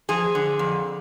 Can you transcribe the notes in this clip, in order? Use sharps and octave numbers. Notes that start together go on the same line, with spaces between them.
F3 G#4
D3
F2